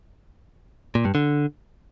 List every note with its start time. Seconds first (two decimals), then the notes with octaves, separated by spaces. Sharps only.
0.95 A#2
1.05 G2
1.15 D3